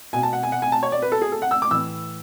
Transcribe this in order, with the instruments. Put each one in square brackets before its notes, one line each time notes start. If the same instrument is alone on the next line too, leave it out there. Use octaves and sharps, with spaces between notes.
[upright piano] B2 G#5
A5
F#5
G#5
F#5
G#5
A5
C#5
D5
B4
A4
G#4
A4
F#5
E6
D6
A2 E3 E6